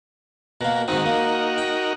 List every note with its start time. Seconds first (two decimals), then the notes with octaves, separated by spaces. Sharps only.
0.61 B2 A#3 F#4 A#4
0.88 G#2 D#3 C4 D#4 F#4 A#4
1.06 A#3
1.58 G5